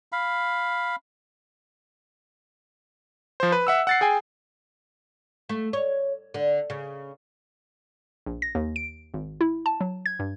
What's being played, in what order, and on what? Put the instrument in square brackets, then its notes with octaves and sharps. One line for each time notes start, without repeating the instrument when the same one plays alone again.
[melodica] F5 B5
[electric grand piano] F3 C5
B4
E5 F#5 E6
F#5 A6 C7
G#4 G5 G#5
[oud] A3
C#5
D3
C#3
[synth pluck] A#1
A#6
D#2
D7
G#1
E4
A5
F#3
G#6
G2